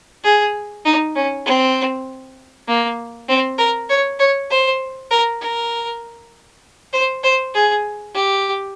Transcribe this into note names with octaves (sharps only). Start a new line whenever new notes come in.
G#4
D#4
C#4
C4
A#3
C4
A#4
C#5
C#5
C5
A#4
A#4
C5
C5
G#4
G4